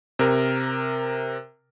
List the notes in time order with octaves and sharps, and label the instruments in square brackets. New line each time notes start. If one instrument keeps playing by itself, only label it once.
[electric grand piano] C3 A#4